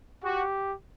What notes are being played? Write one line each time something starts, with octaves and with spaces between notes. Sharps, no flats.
F#4 G4